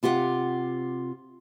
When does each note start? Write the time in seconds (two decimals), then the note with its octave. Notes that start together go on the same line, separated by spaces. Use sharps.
0.03 C3 F4 G4 F#5